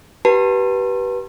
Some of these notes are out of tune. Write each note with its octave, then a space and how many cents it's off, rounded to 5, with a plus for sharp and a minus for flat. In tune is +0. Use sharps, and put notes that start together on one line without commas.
G4 -30 B4 -20 A5 +20